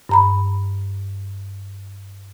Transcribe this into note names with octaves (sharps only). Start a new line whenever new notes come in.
G2 A#5 B5